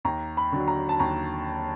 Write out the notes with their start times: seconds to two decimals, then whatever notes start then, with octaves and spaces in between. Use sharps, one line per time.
0.05 D#2 A#5
0.37 B5
0.52 D3 F#3
0.68 A#5
0.89 A5
1.00 D#2 A#5